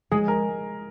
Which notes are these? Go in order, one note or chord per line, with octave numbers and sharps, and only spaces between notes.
G#3 G#4
A#4